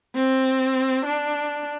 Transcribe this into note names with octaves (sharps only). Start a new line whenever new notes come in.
C4
D4